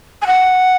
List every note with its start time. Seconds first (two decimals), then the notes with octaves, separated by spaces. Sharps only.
0.22 G#5
0.27 F#5